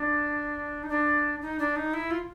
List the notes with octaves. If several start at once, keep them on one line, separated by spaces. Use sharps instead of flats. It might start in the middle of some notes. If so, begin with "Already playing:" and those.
Already playing: D4
D#4
D4
D#4
D4
D#4
E4
F4